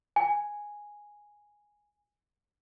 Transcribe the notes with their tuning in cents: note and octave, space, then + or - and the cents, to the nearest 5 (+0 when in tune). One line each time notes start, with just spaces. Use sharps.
G#5 -5